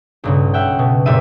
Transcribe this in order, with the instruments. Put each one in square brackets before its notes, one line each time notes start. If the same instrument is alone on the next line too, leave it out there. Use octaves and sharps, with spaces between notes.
[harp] B1 G2 C#3
E5 F#5 G5
B2
F#1 A#2 G4 B4 E5 D#7